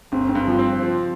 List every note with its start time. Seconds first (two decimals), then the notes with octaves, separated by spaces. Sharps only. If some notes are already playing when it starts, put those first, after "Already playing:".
0.12 G1 C4
0.29 C4
0.35 G2
0.47 F3
0.59 C4
0.83 F3